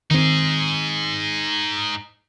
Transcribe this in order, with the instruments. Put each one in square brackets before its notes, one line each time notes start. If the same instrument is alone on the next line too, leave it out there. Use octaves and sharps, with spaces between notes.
[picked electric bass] D#3 C4 [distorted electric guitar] D#4 G#4